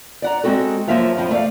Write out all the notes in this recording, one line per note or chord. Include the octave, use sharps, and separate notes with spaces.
D5 F#5 A#5
G#3 A3 C4 F#4 A4
F#2 F3 A#3 E5 F5 A5
F2 A2 F3
A3 D5 F5